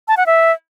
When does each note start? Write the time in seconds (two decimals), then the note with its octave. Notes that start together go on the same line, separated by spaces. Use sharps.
0.08 A5
0.17 F#5
0.26 E5